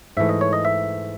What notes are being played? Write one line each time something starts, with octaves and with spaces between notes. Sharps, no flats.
G#2 E3 A3 E5
D#5
C#5
D#5
E5